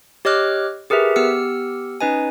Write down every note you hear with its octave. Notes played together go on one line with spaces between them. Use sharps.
G4 C#5 D#5 D6 F6 F#6
G4 G#4 A#4 B4 E5
B3 G4 E6 F6 C#7
C#4 D#4 B4 D#5 G#5